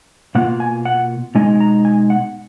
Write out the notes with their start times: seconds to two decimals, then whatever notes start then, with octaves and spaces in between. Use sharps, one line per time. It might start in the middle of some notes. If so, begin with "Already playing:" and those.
0.35 B2 A#3 F4 F#5
0.60 G#5
0.85 F#5
1.35 B2 G#3 D#4 G#5
1.60 A#5
1.85 G#5
2.10 F#5